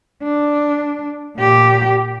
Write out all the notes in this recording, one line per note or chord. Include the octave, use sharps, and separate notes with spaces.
D4
A#2 G4